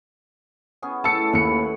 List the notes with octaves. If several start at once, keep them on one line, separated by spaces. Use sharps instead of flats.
B3 C#4 G#4
A2 A5 E6 C#7
D#2 B4 B5 C#7